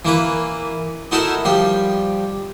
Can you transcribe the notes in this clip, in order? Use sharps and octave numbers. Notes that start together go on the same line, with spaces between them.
E3 A#3 B4 B5
D#4 E4 F#4 A4 A#4 E5
F3 G3 G4